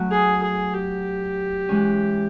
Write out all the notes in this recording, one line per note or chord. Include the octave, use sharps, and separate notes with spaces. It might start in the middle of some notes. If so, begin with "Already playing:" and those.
Already playing: F#3 A3 C#4 F#4
G#4
G#4
G4
E3 G#3 C#4